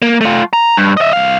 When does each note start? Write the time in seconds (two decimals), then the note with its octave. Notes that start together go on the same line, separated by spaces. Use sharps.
0.02 A#3
0.21 A3 F4
0.53 A#5
0.77 G2
0.97 D#5 E5
1.13 C2 F5